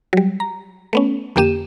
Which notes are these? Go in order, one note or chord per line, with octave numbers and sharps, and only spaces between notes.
F#3 G3
A#5
A3 B3 C#4
F2 D3 A#3 G4 D#7 E7